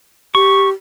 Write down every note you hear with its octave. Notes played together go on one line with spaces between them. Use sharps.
G4 C#6